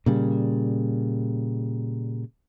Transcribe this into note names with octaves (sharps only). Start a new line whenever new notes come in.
A#2 C#3 G3